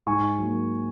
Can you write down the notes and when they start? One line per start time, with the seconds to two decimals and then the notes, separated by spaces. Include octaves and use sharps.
0.06 G#2 G#5 C#6
0.39 F#3 A#3